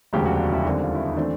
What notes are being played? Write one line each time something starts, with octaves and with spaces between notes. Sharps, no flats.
E1 D2 C#3 F3 G4
F#4
F4
E4
D#2 D3 G3 C4
F4
E4
D#4
E3 A3 C4 D4